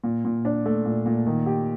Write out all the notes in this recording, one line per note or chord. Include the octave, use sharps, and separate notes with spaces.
A#2
A#2
D4
A3
A#2
A#2
D#3
G4